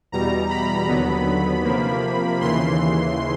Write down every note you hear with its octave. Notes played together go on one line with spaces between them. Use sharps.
E2 B2 G3 A#5
B5
D#2 D3 F#3 B3
C3 F3 A#3
D#2 C#3 E3 C6